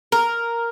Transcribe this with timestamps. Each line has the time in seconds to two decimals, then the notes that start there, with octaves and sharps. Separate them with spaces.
0.12 A#4